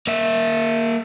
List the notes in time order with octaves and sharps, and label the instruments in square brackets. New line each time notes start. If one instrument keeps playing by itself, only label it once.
[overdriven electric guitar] A#3 E5